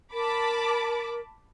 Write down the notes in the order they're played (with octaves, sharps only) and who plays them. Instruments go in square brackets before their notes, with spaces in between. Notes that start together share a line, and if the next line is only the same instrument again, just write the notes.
[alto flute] A#4 [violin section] A5 B5 D6